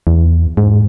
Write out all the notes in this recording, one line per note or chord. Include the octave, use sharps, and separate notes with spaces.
E2
G#2